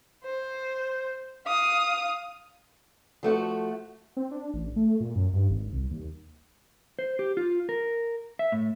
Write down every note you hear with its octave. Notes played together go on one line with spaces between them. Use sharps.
C5
F5 D#6
F3 A3 F#4
C4
D4
A1
A3
A#2
F#2
G2
G#1
C2
D#2
C5
G4
F4
A#4
E5
A2